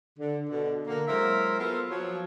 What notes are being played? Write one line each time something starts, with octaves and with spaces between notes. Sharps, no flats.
D3
B2 D3
D3 A#3
F#3 G#3 E4 A#4 C5 E5
A#3 B3 F4 A4 C5 F5
F3 F#3 C#5